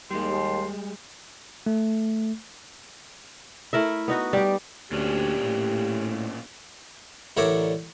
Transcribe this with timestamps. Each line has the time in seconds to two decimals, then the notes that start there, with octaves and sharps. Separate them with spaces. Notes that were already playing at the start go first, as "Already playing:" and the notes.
0.11 D#2 G3 G#3 C6
1.66 A3
3.73 A3 E4 A#4 E5
4.08 B3 D#4 F#4
4.33 G3 G4
4.92 D2 A#2 C#4 D4 G4
5.45 A2
7.37 A1 D3 A#4 C#5 D5 E5